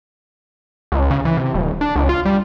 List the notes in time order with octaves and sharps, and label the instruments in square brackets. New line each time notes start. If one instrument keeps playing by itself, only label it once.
[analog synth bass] C#2
C#3
E3
C3
D#1
D4
C#2
F4
G3